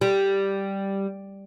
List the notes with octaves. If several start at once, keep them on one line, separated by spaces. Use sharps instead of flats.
G3